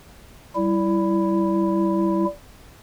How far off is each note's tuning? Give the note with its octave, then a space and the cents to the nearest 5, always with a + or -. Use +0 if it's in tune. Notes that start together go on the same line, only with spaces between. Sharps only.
G3 -15 E4 +10